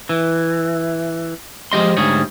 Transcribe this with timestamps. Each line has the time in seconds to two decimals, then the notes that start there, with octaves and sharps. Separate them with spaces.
0.09 E3
1.72 F3 G#3 G4 D#5 C6
1.97 D2 G#2 G3 G#4 C#5